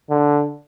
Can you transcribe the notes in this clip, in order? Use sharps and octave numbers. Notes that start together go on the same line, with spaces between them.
D3